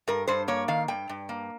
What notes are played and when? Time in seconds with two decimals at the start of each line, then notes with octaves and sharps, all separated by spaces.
0.08 G2 A#4
0.28 G2 C5
0.48 A#3 C#5
0.68 D#3 F5
0.88 G2 G5
1.09 G2
1.29 A#3